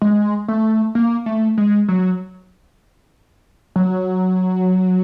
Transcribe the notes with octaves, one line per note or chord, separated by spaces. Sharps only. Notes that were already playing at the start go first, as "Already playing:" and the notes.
G#3
A3
A#3
A3
G#3
F#3
F#3